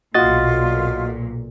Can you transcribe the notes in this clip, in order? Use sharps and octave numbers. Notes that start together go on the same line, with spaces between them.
B1 A#2 F4 F#4 D#5 A6